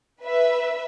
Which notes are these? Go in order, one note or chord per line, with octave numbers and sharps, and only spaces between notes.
B4 E5